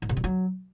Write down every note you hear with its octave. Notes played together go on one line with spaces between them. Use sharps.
G#2
C3
G2
F#3